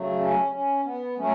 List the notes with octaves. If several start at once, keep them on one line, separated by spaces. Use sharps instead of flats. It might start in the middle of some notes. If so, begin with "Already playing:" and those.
Already playing: C#3 F#3 A3
C#4
C#4
B3
F#3 A3 C#4